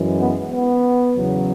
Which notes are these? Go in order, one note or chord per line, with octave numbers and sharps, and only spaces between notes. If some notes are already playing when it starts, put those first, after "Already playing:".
Already playing: F#2 E3 G#3
B3
B3
E2 C#3 F#3